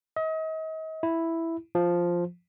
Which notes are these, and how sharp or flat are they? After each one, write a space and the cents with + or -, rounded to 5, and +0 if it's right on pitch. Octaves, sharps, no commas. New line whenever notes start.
D#5 +40
E4 +0
F3 +0